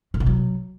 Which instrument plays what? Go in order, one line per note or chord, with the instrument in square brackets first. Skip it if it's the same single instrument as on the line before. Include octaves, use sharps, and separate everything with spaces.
[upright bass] A#2
B2
F#3